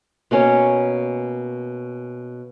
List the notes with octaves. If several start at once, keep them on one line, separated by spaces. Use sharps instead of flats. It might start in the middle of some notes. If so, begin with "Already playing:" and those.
B2 A#3 C#4 C#5